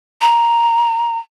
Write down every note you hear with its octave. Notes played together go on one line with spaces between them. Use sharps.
A#5